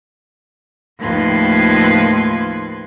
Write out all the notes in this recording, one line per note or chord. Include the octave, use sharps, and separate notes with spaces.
D#2 A2 F3 B4 C6 G#6